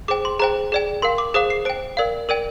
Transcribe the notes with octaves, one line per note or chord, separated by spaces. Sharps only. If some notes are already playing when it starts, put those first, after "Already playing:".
G#4 C5 G5 D6
C6
G#4 C5 G5 A#5
G#4 D5 G5
A#4 F5 C6
D6
G#4 C5 F5 D#6
C7
C5 G5 D7
A#4 D5 F5
A#4 D5 G5 D#7